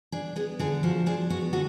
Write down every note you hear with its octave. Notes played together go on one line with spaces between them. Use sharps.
D4 G#4
B3 G#4
D3 G#4
F3 F#4
D4 G#4
B3 F#4
D3 F#4